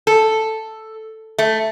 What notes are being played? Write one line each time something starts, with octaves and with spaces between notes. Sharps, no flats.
A4
A3